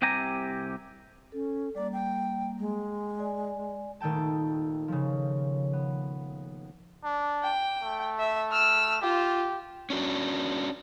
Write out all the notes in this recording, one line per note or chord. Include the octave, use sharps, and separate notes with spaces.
C2 C3 G4 G#5 A#5
C#4 A4
G3 A#3 D5
G5
G#3
D5 G#5
D#1 D#3 A3 G5 A5
C#3 F3
B3
D4
G5
A3
E5
E6 F6
F4 G4
C#4 D4 F#4